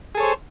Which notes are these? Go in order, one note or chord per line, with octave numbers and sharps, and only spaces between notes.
G#4 A4 C5 C#5